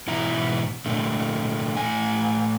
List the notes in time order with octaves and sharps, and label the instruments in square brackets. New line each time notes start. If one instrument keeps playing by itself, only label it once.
[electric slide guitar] G#2 B2 E3 E4 A#5
A#2 D3 A3
A2 G#5